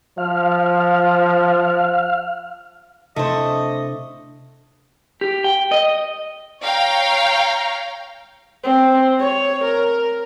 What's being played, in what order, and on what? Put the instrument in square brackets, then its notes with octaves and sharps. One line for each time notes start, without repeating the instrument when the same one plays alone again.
[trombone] F3 [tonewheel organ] F5
[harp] C3 D4 E4 [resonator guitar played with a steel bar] A3 C5 [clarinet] D#5
[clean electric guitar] G4
G5
D#5
[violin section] C#5 F5 G5 A#5
[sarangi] C4
C#5
A#4